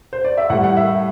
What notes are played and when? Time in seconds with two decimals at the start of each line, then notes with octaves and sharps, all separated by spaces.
0.13 C5
0.24 D5
0.37 E5
0.50 A2 G3 F#5
0.64 F#5
0.77 E5